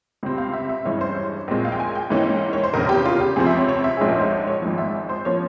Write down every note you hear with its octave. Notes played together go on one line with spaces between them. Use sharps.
C#2 C3 G3 C4
F5
E5
E5
G2 E3 G#3 C#4 C#5
C5
C#5
A#1 A#2 G#3 C4
F5
G5
G#5
G5
G#2 E3 A#3 C#4
C#5
C5
F1 E2 C#3 A#4
G4
F4
G4
C#2 C3 F3 C4 G#4
E5
C#5
C#5
E5
A#1 G#2 F3 G#3 C#4 G#4
A#4
C5
C#5
C#5
G#1 G#2 F3
E5
C5
F3 A#3 C#4 C#5